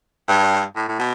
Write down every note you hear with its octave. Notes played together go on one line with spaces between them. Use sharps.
G2
A2
A2
B2